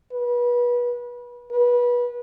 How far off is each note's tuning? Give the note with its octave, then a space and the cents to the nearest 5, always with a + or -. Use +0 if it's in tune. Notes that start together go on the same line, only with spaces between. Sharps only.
B4 -30
B4 -25